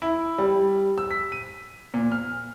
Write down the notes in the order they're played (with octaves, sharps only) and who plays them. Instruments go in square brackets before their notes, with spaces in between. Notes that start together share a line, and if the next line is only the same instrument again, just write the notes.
[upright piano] E4
G3
E6
B6
D#7
A#2
F6